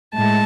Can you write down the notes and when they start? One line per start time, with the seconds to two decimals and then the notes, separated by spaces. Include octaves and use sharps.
0.14 A2 G#3 A5